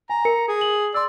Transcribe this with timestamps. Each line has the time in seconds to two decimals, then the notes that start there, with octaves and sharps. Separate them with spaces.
0.10 G#5 A#5
0.25 A#4 C#7
0.48 G#4
0.61 F#7
0.94 D5 C6 E6